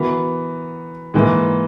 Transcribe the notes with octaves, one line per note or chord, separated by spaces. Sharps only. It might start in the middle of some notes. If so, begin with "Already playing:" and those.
Already playing: E3 B3 F#4 A#4
G#2 E3 A#3